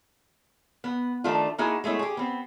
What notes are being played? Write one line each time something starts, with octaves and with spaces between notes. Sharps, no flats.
B3
D#3 F3 A3 D4 F4
A#3 D#4 E4 F#4 G#4
G#3 A3 B3 E4 C#5
G4 G#4
B3 C4